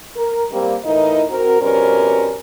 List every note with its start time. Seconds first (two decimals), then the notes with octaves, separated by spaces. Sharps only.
0.17 A#4
0.51 G3 A#3 C4
0.85 A2 E3 D#4 E4 A#4 D#5
1.30 C4 F#4 A#4
1.61 F2 B2 G3 C#4 A#4 C5